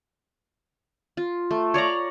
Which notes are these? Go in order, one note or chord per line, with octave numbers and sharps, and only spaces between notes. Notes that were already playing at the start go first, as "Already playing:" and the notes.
F4
A3
C#5 D5 F5 A#5